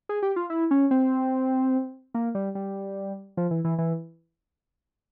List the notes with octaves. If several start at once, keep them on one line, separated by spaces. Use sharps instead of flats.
G#4
G4
F4
E4
C#4
C4
A#3
G3
G3
F3
E3
E3
E3